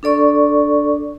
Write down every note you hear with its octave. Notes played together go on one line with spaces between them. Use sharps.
D4 A4 D5 C#6